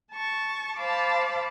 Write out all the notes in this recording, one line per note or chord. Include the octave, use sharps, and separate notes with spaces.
A5 C#6
C5 F5 A5 B5 D6